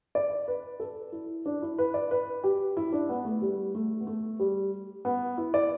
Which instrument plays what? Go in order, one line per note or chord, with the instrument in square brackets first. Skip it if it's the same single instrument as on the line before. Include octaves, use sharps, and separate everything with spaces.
[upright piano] D5
B4
A4
E4
D4
E4
B4
D5
B4
G4
E4
D4
B3
A3
G3
A3
B3
A3
G3
B3
E4
D5